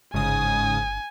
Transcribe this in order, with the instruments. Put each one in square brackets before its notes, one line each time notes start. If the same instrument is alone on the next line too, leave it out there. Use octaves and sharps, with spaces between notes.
[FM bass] G1 [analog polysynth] G#2 C#3 D#6 [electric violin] G#5